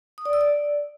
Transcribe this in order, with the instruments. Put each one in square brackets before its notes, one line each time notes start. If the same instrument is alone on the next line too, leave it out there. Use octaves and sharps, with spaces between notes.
[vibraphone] D#6
D5
E6
D5